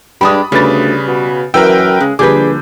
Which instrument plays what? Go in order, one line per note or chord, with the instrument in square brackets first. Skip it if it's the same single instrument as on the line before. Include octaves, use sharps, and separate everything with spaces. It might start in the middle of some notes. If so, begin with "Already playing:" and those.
[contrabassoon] G2 [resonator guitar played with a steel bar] G#3 D4 G4 [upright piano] B5 D#6
[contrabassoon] D2 [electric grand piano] C#3 B4 A6 [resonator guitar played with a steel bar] G3
[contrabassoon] B2
[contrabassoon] F#2 [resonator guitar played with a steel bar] E3 [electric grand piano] A#4 B4 G5 [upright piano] E6
[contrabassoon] C#3 [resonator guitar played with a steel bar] G#3
[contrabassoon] A#1 [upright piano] D3 G3 [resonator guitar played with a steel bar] G#4 B4 [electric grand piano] D6 G6